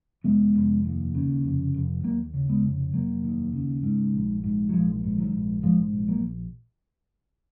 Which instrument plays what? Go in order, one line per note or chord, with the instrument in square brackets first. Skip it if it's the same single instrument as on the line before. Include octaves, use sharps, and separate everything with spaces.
[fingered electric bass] F1 G#3 B3
F1
D#2
C#3
F1
F1
D#2 F#3 A#3
C#3
G#3 B3
F1
F1 F#3 A#3
D#2
C#3
G#2
A#1
G#2
F#3
A#1 F3 G#3
G#2
D#3 F#3
A#1
G#2 F3 G#3
A#1
F#3 A#3